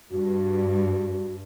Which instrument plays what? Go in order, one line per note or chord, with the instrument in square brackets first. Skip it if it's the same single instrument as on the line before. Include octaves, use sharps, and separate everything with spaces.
[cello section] G2 [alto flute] F#4